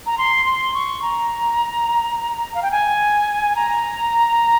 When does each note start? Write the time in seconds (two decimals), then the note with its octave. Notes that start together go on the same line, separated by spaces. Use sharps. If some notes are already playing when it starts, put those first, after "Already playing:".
0.06 A#5
0.18 C6
0.46 C6
0.74 C#6
1.02 A#5
2.54 F5
2.62 G5
2.72 G#5
3.56 A#5